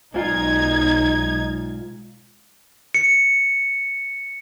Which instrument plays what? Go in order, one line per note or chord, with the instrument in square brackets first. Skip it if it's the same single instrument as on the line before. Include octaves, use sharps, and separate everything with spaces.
[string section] B1 D#4 G#6 [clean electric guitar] G#2 F4
[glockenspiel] C#7